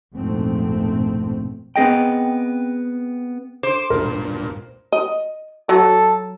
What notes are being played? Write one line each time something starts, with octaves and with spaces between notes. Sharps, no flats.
A#1 F2 G#2 B2 A3 C4
B3 C4 G#4 D#5 G5
C5 D6
G2 A#2 A#4
D#5
F#3 A4